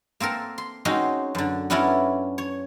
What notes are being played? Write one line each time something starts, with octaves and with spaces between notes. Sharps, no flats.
A#3 C4 A4 A#4
C6
G#3 C4 C#4 D#4 F#4 C6
F#2 D3
B3 C#4 D4 E4 A4 A#4
C#5